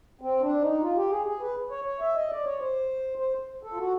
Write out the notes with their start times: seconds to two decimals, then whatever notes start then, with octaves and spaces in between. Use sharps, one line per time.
0.21 C4
0.42 D4
0.62 D#4
0.81 F4
0.96 G4
1.10 G#4
1.26 G#4
1.40 B4
1.70 C#5
1.85 C#5
2.00 E5
2.15 D#5
2.30 D5
2.44 C#5
2.60 C5
3.18 C5
3.63 A4
3.71 F4
3.77 F#4